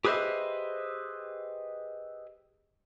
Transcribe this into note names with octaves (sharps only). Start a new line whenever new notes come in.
G4 G#4 B4 C5 D#5 E5